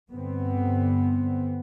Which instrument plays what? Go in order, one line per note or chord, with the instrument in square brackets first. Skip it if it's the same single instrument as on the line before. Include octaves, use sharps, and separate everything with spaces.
[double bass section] G2 D3 B3 C4